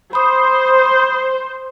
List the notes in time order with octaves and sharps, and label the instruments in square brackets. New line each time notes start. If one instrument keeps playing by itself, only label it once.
[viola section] C5 [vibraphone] B5 D#6